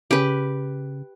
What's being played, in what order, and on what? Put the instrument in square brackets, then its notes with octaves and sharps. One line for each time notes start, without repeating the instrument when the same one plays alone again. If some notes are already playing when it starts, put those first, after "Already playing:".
[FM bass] C#3 [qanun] G4 B4